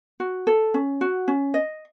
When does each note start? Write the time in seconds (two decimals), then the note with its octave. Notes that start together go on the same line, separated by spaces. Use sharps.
0.20 F#4
0.47 A4
0.74 C#4
1.01 F#4
1.28 C#4
1.54 D#5